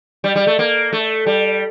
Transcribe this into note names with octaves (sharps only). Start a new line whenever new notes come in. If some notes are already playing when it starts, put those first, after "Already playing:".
G3
G3
A3
A#3
A3
G3